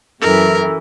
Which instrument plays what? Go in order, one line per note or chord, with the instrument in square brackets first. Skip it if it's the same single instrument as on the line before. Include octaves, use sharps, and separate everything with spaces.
[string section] F#2 E3 [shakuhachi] A4 [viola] A#4